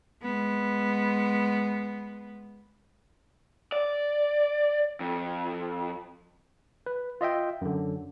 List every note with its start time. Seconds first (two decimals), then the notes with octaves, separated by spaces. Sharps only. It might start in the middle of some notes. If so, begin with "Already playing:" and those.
0.22 G#3 B3
3.72 D5
5.00 F2
6.86 B4
7.21 F4 D#5 E5 G5
7.61 F#2 D3